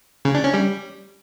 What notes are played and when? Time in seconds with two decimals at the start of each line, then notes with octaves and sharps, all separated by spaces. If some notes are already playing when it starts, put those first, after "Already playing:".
0.25 C#3
0.35 D4
0.44 C#4
0.54 G3